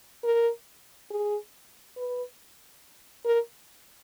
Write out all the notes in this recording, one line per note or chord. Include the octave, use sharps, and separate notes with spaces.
A#4
G#4
B4
A#4